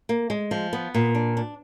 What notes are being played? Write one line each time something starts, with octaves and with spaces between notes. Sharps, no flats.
A#3
G#3
F3
B3
A#2
D4
D4